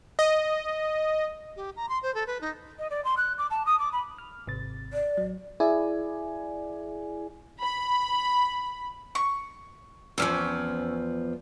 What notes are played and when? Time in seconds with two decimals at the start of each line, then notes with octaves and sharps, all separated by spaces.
0.19 D#5
1.56 G4
1.76 A#5
1.89 C6
2.03 C5
2.15 A4
2.27 B4
2.41 D#4
2.79 D#5
2.90 D5
3.05 C6
3.17 F#6
3.38 D6
3.51 A5
3.66 D#6
3.80 D6
3.93 B5
4.18 F6
4.47 G#1 C3 A6
4.93 D5
5.17 A1 F#3
5.60 E4 G#4 D5 G#5
7.60 B5
9.15 C#6
10.18 E2 F3 C4 C#4 D6